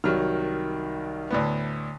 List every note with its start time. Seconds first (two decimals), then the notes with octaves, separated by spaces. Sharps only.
0.04 C2 D#3 F#3 F6
1.31 D2 A2 B3